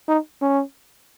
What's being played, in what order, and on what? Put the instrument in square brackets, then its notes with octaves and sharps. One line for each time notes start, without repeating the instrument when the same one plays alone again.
[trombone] D#4
C#4